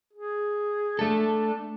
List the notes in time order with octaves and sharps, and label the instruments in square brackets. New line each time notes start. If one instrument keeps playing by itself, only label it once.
[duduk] G#4
[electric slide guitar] A3 A4 [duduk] D4